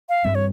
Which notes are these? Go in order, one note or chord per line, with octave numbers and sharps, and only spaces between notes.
F5
G2 G3 C4 E5
C#5